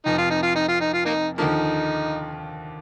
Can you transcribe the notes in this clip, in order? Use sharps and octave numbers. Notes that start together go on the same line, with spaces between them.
F1 F2 C3 F3 D#4
F4
D#4
F4
D#4
F4
D#4
F4
A#3 D#4
D#2 D3 F3 A#3 D#4